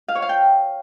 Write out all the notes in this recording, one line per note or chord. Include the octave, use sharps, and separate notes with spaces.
F5
C#5
F5
G5